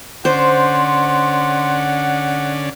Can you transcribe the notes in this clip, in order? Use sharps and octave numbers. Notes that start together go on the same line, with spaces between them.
D3 C#4 C5 D5 F#5 C6